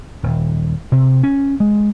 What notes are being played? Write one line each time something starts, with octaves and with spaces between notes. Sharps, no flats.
D#1
C3
C#4
G#3